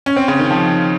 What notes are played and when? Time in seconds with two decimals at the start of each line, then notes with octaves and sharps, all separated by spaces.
0.06 C#4
0.16 C4
0.28 C#3
0.40 D#3
0.51 F3